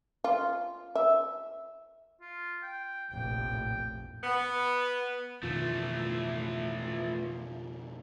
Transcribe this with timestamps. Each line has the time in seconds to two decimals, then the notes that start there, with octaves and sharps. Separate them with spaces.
0.24 F4
0.95 E5
2.21 F4
2.63 G5
3.10 F1 A#1 A2 G5
4.24 B3
5.43 F2 B2 D#3 E3 A3 F4